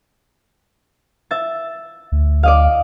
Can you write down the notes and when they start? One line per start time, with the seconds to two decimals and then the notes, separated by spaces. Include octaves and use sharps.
1.31 E5 A6
2.12 D2
2.43 D5 D#5 F5